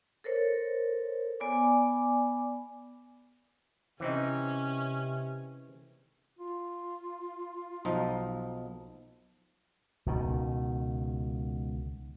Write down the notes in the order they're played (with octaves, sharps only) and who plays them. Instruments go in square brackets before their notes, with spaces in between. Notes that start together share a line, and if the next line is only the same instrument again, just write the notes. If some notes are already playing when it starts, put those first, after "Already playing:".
[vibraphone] A4 A#4 C5 C#5
B3 D5 G#5 B5 D6
[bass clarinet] C3 [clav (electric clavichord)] E3 C4 D#4 [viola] C#4
[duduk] F4
[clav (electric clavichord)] B1 F3 D#4
[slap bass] C#2 B2 D#3